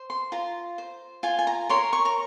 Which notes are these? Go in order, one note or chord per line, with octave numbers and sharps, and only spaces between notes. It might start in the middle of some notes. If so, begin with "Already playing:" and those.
Already playing: C5
C6
F4 A#5
C5
F4 G#5
G#5
A#5
A#4 C#5 C6
C#6
A#5